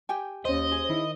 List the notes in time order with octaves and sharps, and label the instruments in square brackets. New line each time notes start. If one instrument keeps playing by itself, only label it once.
[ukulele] G4 G5 G#5
[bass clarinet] D#2 [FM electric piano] C#4 C5 [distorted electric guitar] D#5
[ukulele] G#4
[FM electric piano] D#3 [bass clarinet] E4